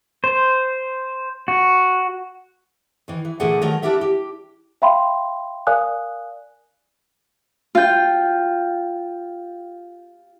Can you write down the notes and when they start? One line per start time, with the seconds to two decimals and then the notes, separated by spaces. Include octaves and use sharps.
0.24 C5
1.48 F#4
3.08 D#3 E3
3.25 E3
3.40 A#2 D3 E3 A3 G#4 F#5
3.62 D#3 F#3 A3 A#4
3.82 D4 E4 F4 G4 A#4 E5
4.01 G4
4.82 E5 F5 G5 B5 C6
5.67 A#4 D5 F5 G#5 D#6 F#6
7.75 F4 G5